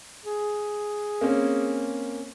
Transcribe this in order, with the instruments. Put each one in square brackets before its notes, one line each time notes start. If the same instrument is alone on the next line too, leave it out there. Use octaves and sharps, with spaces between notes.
[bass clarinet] G#4
[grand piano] A#3 C4 C#4